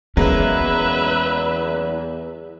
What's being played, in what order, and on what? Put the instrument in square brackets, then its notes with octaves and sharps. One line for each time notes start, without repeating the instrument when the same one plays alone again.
[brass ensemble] E2 [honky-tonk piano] F#3 G#3 A#3 [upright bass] C#4 [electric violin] B4 E5